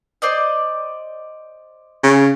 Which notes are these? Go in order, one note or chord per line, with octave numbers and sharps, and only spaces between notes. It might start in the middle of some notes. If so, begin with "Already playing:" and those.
C5 D5 D#5
C#3